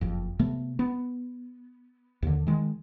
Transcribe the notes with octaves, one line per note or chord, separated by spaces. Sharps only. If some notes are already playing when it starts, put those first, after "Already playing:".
F#1 F2
C3 A3 B3
B3
D#2 D3
D#3 G#3